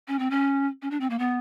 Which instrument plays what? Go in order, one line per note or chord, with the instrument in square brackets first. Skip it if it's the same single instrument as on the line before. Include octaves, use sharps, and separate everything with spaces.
[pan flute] C#4
C4
C#4
C#4
D4
C4
A#3
B3